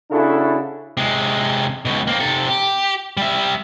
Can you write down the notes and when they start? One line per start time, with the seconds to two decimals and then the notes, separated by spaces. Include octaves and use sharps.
0.11 C#3 D4 E4 F#4 A4
0.97 C3 G#3
1.85 C#2 B2
2.07 A#3 C4
2.20 C3 A4
2.49 G4
3.17 G3 E5